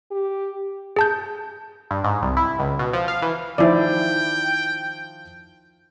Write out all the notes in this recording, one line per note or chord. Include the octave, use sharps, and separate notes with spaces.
G4
G#4 A5 G6
G2
G#2
C2
E4
C#2
B2
F3
F5
E3
D#3 F3 E4 C5 D5 G5